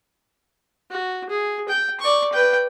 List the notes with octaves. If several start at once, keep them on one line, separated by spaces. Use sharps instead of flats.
F#4
G#4
G5
D5 C#6
B4 G5